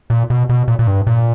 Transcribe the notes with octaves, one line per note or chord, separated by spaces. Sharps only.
A#2
B2
B2
A#2
A#2
G2
A#2